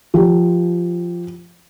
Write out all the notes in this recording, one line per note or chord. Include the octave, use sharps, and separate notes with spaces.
F3 G4